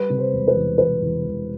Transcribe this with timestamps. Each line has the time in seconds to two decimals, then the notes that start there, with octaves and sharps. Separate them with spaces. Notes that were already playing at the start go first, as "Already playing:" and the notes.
Already playing: G3 B4
0.10 C3
0.18 C5
0.33 E1
0.48 B4
0.56 E2
0.78 E1 B4
1.01 E2
1.24 E1